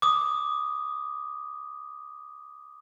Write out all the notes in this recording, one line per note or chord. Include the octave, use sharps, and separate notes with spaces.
D6 D#6